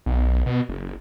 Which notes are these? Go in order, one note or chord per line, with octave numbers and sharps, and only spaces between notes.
B1
B2
F#1